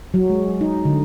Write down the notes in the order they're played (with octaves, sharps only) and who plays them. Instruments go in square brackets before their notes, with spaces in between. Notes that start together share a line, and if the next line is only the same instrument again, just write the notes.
[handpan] F#3
G#3
D#4
D3